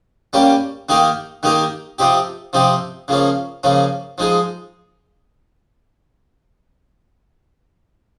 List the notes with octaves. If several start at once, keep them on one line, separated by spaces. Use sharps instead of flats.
G3 A#3 C#4 G4
D#3 A#3 D#4 G4 A#4
D#3 A#3 D#4 G4 A#4
C3 F3 C4 D#4 G4
C3 F3 C4 D#4 G4
C#3 F3 A#3 C#4
C#3 F3 A#3 C#4
F3 G#3 D#4 G#4